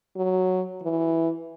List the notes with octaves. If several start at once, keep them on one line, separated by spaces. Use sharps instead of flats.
F#3
E3